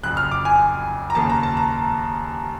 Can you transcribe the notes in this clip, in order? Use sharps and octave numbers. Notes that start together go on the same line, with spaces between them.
F#1 F2 C#3 F#6
F6
D6
G#5
A#5
D#2 C#3 F3 A#3 A5
A#5
A5
A#5